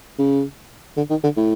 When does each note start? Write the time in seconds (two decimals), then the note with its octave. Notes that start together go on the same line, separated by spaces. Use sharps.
0.18 C#3
0.97 D3
1.10 D#3
1.24 D3
1.37 A2